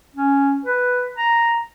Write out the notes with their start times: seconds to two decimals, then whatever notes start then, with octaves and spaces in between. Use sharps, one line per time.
0.15 C#4
0.65 B4
1.17 A#5